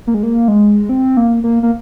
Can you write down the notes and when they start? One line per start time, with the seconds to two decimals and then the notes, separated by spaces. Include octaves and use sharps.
0.07 A#3
0.14 G#3
0.23 A#3
0.48 G#3
0.89 C4
1.17 A#3
1.44 A#3
1.63 A#3